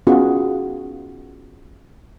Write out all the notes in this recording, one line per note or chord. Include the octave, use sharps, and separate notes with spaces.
B3 C#4 D#4 F4 F#4 G#4